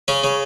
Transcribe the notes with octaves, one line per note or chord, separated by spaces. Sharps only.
C#3 C#4
C#3